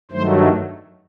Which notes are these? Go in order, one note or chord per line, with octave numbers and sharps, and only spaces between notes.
G2 D#3 F#3 A3 C5